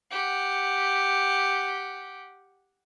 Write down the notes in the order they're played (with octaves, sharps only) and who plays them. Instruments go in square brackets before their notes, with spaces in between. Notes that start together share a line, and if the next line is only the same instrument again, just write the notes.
[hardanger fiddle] G4 F#5